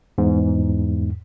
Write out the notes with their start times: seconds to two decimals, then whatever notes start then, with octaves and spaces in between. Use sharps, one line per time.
0.18 E2 G#2